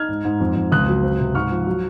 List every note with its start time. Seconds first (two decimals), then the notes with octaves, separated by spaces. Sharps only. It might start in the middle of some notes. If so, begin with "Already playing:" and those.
Already playing: D#4 F6 G#6
0.09 G#2
0.25 G#2
0.40 F2
0.56 F2
0.72 C#2 D#6 F#6
0.88 F#3
1.03 C4
1.20 C3
1.35 G#2 C#6 F6
1.51 F3
1.67 F#3